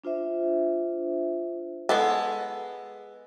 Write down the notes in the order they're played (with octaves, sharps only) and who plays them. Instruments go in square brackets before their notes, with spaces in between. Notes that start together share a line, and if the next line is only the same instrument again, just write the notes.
[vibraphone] D4 F4 C5 E5
[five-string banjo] G#3 B3 A4